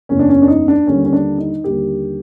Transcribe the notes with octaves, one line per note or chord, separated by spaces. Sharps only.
F#1 E2 C#3 C#4
D4
C#4
D4
D#4
D4
D#2 D3 G3 C#4
C#4
D4
D#4
D#2 D3 G3 G4